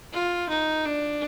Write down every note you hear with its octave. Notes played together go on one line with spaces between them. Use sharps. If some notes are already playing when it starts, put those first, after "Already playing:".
F4
D#4
D4